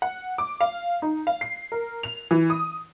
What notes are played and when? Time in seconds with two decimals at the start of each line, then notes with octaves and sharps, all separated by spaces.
0.02 F#5
0.38 D6
0.61 F5
1.02 D#4
1.27 F5
1.41 C7
1.72 A#4
2.03 F7
2.31 E3
2.50 D#6